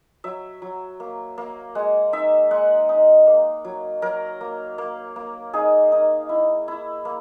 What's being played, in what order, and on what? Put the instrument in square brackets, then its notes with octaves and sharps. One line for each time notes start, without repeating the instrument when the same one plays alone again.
[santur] F#3 E5
F#3
A#3
A#3
G#3 F#5
D#4 E5
G#3 F#5
D#4
A#3
F#3
F#3 A#4
A#3
A#3
A#3
D#4 G#4
D#4
E4
E4
A#3